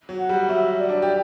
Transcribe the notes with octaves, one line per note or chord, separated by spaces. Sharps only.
F#3
F#5
G3
F#3 E5
D5
D4
G4